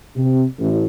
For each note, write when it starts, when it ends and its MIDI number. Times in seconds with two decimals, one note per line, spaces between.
0.16 0.43 48
0.59 0.85 33